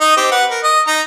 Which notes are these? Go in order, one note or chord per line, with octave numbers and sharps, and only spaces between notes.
D#4 D#5
C4 G4
B4 F#5
A#4
D#5
D#4 A#5